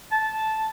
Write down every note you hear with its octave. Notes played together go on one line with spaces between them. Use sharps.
A5